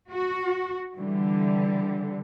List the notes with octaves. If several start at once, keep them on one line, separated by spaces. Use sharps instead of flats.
F#4
D3 E3 G3